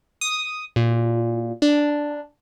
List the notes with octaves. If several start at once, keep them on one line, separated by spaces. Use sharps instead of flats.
D#6
A#2
D4